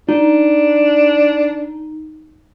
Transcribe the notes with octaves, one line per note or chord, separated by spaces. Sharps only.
D4 D#4